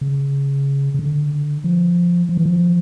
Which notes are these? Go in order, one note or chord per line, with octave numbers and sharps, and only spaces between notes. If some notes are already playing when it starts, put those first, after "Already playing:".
C#3
C#3
D3
F3
F3
E3
F3